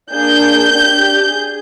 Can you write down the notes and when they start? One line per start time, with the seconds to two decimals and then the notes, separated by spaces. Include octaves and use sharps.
0.12 A#3 D4 G#4 G6
0.71 D4 G4
1.31 G#4